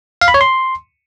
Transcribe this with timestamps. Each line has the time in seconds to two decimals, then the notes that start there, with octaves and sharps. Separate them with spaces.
0.21 F5
0.28 B5
0.34 C#5
0.41 C6